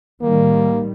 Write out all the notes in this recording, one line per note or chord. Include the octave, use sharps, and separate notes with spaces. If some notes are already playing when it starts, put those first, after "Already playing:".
A2 D#3 G3 A#3